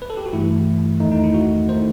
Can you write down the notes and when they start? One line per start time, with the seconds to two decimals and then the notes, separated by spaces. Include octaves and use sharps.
0.02 B4
0.10 A4
0.17 G4
0.26 F#4
0.33 G2 E3 A3 E4
1.00 E2 D#3 A3 D#4
1.12 D#4
1.24 E4
1.34 F#4
1.69 D#3 A3 C5